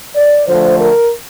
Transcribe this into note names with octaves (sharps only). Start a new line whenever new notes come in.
D5
D3 F3 A3 C5
A#4